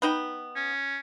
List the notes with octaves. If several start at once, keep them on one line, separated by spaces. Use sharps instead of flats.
B3 D#4 G5
C#4